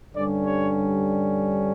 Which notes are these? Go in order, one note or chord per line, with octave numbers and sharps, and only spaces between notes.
G2 D3 G3 C#4 D5
C#5